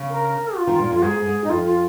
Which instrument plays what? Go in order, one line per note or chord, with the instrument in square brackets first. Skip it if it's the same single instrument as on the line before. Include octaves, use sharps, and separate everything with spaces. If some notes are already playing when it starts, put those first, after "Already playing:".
Already playing: [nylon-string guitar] C#3
[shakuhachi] A#4
F4
[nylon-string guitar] D#3
A#2
F2
[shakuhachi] F4
[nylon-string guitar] G#2 [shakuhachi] G#4
[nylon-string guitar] G#2
[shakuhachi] D#4
[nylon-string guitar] F2 [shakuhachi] F4
[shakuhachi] F4